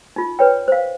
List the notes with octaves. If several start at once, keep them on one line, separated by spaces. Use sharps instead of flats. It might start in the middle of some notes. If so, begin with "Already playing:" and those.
D#4 F4
B4 C#5 G5
C5 F5